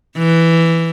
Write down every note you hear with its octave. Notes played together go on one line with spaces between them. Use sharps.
E3